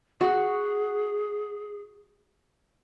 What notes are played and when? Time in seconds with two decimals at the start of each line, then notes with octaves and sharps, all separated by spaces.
0.21 F#4 G#4